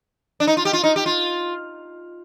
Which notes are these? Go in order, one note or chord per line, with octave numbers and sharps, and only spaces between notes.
D4
D#4
F4
G4
F4
D#4
G4
F4